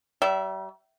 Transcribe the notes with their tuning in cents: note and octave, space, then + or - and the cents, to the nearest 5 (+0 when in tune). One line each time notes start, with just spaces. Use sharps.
G3 -40 E5 +0